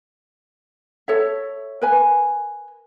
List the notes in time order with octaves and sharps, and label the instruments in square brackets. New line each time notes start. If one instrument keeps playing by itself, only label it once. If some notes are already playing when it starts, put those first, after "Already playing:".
[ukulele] A4 C#5 E5
A#4 B4 G#5